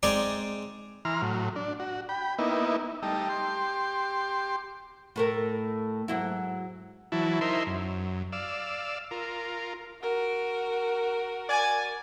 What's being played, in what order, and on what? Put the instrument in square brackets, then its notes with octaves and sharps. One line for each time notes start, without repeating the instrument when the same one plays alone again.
[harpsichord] G#3 C4 D#4 G#4 D5
[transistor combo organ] E3 A#5 C6 F6
A2 F#3
D4
F#4
G5 B5
A#3 B3 D#4 E4
G3 A3 D#4
G4 C6
[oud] A2 A3 A#4
G#2 F#3 E4
[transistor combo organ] E3 F#3 E4 A5
D#4 E4 A#4 C5 E5 C6
F#2
D5 F5 E6
F4 A#4
[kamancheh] F#4 A#4
[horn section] D5 G#5